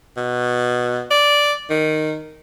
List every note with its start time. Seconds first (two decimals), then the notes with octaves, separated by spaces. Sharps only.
0.17 B2
1.11 D5
1.70 D#3